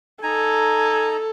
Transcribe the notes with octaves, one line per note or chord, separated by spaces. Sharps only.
D#4 A4 G#5 A#5